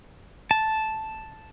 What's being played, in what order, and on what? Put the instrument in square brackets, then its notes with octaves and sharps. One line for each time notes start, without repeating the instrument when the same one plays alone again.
[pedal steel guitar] A5